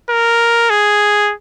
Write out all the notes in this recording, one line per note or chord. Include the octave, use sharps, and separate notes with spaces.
A#4
G#4